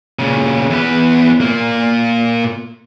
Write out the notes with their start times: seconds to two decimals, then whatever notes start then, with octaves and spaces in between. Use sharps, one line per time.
0.19 A#2 C#3
0.70 E2 B4
1.41 A#2 A#3